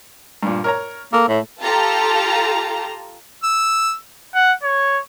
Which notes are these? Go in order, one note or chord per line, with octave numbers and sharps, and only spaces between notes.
G2 A#2
A#4 C#5 A#5
A#3 A4
A2
F4 G4 A4 A5 A#5
E6
F#5
C#5